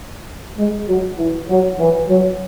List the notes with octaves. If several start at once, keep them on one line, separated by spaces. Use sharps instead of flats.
G#3
F#3
E3
F#3
E3
F#3